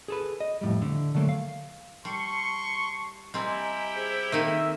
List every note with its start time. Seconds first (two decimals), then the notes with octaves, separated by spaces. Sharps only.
0.08 G#4 A4 B4
0.40 D#5
0.61 F2 A2 G3
0.82 D3 A3
1.15 D3 F#3 A3 A#3
1.29 F5
2.05 G3 A5 C6 C#6
3.34 G3 C4 E4 G4 D#5 G5 G#5 A#5
3.95 G#4 C5
4.32 D#3 A#3 C4 D#4 A4 E5